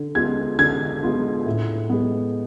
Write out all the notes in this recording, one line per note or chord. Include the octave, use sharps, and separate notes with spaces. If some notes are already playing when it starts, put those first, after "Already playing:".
Already playing: D3
G#3 B3 F4 G#6
D3 G#6
G#3 B3 F4
A2
G#3 B3